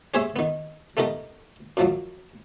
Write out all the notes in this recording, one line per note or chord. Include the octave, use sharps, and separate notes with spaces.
C#4 G4 G#4 C5 C#5 E5
D#3 B3
A3 B3 D#4 G4 A#4
F#2 F3 F#3